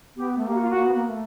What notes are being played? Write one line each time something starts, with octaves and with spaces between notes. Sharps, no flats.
B3 G4
A3
A#3 G4
F#4
F4
F#4
A#3
B3
A#3
A#3
A3